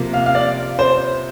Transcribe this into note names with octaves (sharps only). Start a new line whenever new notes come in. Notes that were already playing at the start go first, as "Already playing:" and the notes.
Already playing: C3 F3 A#3
F5
F5
D5
C5